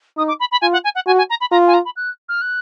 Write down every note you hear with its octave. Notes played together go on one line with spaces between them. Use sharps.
D#4 D#6
D6
B5
B5
F4 G#5
F#5
G#5
F#5
F#4 G#5
G#5
A#5
B5
F4 A#5
G#5
A#5
B5
F#6
F6
F#6